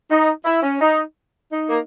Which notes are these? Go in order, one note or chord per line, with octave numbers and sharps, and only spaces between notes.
D#4
E4
C#4
D#4
D#4
A#3